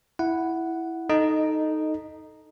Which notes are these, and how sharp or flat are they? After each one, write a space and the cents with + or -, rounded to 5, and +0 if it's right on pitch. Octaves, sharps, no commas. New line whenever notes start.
E4 +0 F#5 +0
D#4 +0 A4 -5 D#5 -10